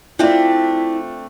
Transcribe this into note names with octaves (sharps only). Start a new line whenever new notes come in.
A3 C4 D4 E4 F4 D5